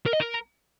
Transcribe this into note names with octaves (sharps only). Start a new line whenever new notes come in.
A#4
D#5
A#4